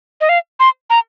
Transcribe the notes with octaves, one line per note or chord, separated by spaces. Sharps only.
D#5
F5
C6
A#5